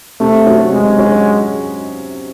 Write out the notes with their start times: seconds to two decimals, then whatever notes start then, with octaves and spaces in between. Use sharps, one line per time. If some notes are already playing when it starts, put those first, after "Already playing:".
0.20 C3 A3
0.46 F#3 C#4 F#4
0.71 C3 G#3
0.97 F#3 C#4 F#4